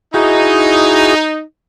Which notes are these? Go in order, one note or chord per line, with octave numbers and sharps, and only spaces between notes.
D#4 E4 F#4 G#4